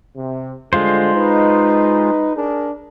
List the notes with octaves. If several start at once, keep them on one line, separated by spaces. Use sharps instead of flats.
C3
D3 G3 G#3 F4 C5
D#4 B4
D4 G#4 A#4